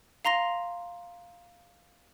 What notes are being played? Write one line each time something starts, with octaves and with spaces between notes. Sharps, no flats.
F5 A#5 C6 A#6 F7